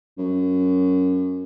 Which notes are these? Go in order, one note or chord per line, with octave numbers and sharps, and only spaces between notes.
F#2